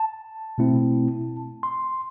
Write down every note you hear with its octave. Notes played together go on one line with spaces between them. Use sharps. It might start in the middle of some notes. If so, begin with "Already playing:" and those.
Already playing: A5
B2 A3 C4 E4
C6